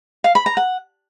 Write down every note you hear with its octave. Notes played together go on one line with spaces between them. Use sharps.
F5
B5
A#5
F#5